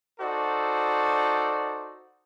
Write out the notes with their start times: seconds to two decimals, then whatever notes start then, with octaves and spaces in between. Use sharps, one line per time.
0.19 D#4 F#4 A4 C5 D5